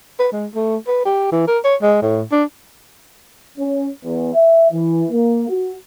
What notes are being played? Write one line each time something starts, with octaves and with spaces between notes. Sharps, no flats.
B4
G#3
A3
B4
G4
E3
A#4
C#5
G#3
A2
D4
C#4
E2
E5
E3
A#3
F#4